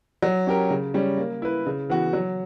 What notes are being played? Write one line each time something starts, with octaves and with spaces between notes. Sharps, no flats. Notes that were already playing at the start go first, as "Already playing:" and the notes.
F#3
C#4 G4 A#4
C#3
G3 C#4
A#3
E4 B4
C#3
E3 B3 F#4
F#3